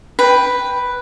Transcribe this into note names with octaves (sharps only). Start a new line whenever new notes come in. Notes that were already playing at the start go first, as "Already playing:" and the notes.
B4 G5